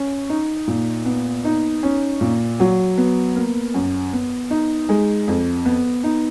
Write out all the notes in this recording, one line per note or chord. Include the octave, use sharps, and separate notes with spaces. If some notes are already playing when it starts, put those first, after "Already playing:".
Already playing: C#4
D#4
A#2
B3
D#4
C#4
A#2
F#3
B3
A#3
F#2
B3
D#4
G#3
F2
B3
D#4